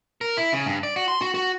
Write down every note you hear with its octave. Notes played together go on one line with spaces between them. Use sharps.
A#4
E4
C#3
G2
D5
F#4
C6
F#4
F#4